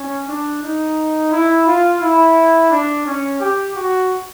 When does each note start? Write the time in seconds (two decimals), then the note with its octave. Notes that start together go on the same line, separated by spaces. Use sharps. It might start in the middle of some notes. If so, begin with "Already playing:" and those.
Already playing: C#4
0.27 D4
0.62 D#4
1.31 E4
1.66 F4
2.00 E4
2.70 D4
3.05 C#4
3.39 G4
3.75 F#4